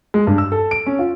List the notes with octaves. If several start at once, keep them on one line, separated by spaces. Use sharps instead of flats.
G#3
G2
E6
A4
D7
C#4
F4